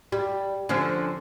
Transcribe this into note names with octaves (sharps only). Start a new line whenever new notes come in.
G3
D3 F3 C#4